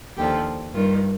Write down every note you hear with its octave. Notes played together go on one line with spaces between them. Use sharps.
D#2 D3 F3 G4
G2 D#3 F4